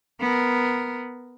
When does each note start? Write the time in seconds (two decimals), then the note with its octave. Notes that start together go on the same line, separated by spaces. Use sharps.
0.20 B3 A#4